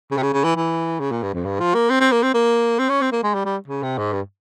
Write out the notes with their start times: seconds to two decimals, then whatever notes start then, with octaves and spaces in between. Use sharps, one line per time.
0.11 C#3
0.18 C3
0.23 C#3
0.33 C#3
0.44 E3
0.56 E3
1.00 C#3
1.12 A#2
1.23 G2
1.33 F2
1.45 G2
1.60 F3
1.74 A#3
1.90 C4
2.00 C4
2.12 A#3
2.23 C4
2.34 A#3
2.78 C4
2.89 C#4
3.01 C4
3.12 A#3
3.23 G#3
3.34 G3
3.45 G3
3.67 C#3
3.83 C3
3.98 G#2
4.12 G2